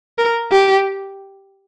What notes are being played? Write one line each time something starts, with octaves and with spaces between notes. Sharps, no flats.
A#4
G4